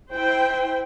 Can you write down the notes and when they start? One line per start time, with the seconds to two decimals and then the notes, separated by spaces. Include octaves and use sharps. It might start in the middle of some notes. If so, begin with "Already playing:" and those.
0.11 E4 C5 G5